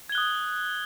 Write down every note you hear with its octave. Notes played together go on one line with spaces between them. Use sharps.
D#6 F#6 G#6 G7